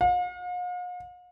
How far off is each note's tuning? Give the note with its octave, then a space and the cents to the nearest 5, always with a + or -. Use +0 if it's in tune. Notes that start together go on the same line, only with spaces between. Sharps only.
F5 +45